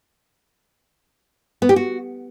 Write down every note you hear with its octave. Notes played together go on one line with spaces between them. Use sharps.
B3
G4
F#4